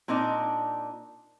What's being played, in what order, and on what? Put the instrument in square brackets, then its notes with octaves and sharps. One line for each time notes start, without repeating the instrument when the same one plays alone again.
[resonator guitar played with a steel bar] A#2 C4 D4 D#4 D5